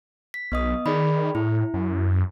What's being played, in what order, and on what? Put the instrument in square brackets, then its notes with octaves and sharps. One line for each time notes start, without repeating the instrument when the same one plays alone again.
[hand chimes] B6
[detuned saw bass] B1 [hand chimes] B3 D#5 D#6
[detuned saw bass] D#3 [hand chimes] G#4 D5 B5
[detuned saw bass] A2 [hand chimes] E4
[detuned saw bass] F#2